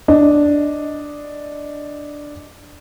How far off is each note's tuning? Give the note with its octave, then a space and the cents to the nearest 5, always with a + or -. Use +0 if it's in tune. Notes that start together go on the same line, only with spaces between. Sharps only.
D4 +0 D#5 +0